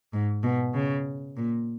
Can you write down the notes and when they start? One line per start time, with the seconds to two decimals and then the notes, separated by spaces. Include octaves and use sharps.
0.13 G#2
0.43 B2
0.74 C#3
1.37 A#2